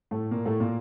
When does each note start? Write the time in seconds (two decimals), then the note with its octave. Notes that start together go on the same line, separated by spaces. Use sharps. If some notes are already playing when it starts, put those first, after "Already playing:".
0.11 A2 A3
0.31 A#2 A#3
0.45 A2 A3
0.60 A#2 A#3